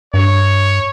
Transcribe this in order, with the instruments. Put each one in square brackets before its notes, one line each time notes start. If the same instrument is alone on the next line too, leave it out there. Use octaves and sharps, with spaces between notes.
[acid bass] G2 [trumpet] C#5